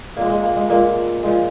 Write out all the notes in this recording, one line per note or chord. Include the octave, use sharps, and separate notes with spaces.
A#2 G#3 A#3
G#3
A#3
G#3
A#2 G#3 A#3
A#2 F3 G#3